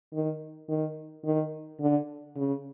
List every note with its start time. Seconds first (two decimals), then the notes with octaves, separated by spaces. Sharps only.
0.13 D#3
0.68 D#3
1.25 D#3
1.80 D3
2.36 C#3